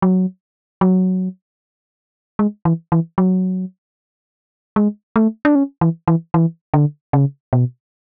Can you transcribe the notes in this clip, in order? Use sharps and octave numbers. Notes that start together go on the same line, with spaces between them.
F#3
F#3
G#3
E3
E3
F#3
G#3
A3
D4
C#4
E3
E3
E3
D3
C#3
B2